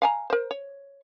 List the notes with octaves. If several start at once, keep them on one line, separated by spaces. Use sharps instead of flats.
F5 G#5 A#5
A#4 C5
C#5